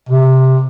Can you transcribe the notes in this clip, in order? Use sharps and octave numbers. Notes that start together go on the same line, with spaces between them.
C3